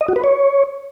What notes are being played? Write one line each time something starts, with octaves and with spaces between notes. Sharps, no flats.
D#5
F#4
B4
C#5